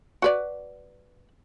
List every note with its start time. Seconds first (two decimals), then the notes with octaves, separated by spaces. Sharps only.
0.22 F#4 B4 D5